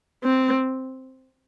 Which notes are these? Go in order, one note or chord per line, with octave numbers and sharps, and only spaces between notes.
C4